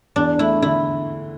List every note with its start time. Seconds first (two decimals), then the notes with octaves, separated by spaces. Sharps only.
0.16 E2 D4
0.39 A3 E4
0.62 D3 E4